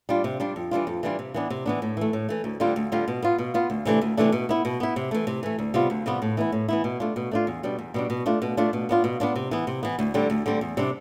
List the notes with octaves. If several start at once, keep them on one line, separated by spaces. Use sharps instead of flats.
G3 D4 F4
C3
G3 D4 F4
F2
E3 G3 D4 F4
F2
E3 G3 D4 F4
C3
E3 B3 D4
C3
E3 B3 D4
A2
E3 A3
A2
E3 A3
D2
D3 G3 C4 F4
D2
D3 G3 C4 F4
B2
B3 F4
B2
B3 F4
D2
C3 E3 A3 D4
D2
C3 E3 A3 D4
B2
B3 E4
B2
B3 E4
C3
E3 A3
C3
E3 A3
D2
C3 G3 B3 F4
D2
C3 G3 B3 F4
A2
E3 B3 E4
A2
E3 B3 E4
B2
A3 D4 F4
B2
A3 D4 F4
E2
B2 G3 D4
E2
B2 G3 D4
B2
A3 D4 F4
B2
A3 D4 F4
B2
B3 D4 F4
B2
B3 D4 F4
C3
E3 B3
C3
E3 B3
D2
D3 G3 C4
D2
D3 G3 C4
E2
C3 G3 D4